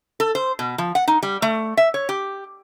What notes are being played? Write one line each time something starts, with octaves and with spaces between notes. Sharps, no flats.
A4
C5
B2
F3
F#5
D#4
G3
A3
E5
C#5
G4